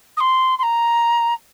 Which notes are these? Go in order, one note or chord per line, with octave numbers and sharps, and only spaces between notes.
D#6
C6
C6
A#5